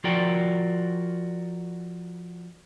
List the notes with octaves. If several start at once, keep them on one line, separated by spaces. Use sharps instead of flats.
F3 F4 F#4 A#4 D5 G5